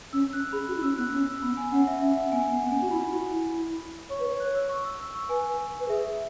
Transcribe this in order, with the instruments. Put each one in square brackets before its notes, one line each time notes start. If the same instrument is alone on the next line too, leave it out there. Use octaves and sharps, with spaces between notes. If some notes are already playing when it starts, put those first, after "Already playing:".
[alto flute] C#4 [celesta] E6
[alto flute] C#4 [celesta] F#6
[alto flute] G#4 [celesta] B5
[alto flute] F#4
E4
[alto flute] C#4 [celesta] E6
[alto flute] B3 [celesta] F#6
[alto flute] C#4 [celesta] E6
[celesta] E6
[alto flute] B3 [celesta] B5
[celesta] G#5
[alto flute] C#4 [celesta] F#5
[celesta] E5
[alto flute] C#4 [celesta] E5
[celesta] F#5
[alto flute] C#4
[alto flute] B3 [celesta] G#5
[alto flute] B3 [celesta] F#5
[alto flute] B3
[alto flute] C#4 [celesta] G#5
[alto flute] F#4
[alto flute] E4 [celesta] B5
[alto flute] E4
F#4
E4
[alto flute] C#5 [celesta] C#6
[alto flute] B4
[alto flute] C#5 [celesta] C#6
[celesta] F#6
E6
C#6
E6
E6
C#6
[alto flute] B4 [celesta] G#5
[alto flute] B4
[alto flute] G#4 [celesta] E5